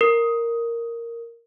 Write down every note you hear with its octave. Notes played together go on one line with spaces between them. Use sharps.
A#4